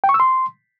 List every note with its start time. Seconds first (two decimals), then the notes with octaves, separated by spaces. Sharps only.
0.04 G5
0.09 C#6
0.14 E6
0.20 C6